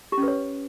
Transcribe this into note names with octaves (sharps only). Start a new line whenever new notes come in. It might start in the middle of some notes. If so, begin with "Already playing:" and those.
G4
C#4
B4
C#5